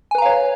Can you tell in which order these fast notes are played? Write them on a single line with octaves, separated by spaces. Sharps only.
G#5 B4 A#5 F5 C#5